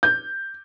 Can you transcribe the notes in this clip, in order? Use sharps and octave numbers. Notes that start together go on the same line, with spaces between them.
G6